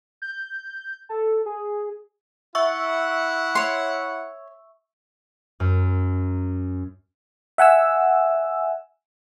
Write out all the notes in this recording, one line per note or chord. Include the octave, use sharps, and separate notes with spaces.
G6
A4
G#4
E4 E5 F#5 C#6 E6
C#5 C6
F#2
E5 F#5 G#5 E6